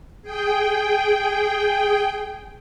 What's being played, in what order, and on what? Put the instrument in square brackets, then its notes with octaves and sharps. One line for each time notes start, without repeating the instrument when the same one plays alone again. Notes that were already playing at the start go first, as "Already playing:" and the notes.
[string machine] G#4 G5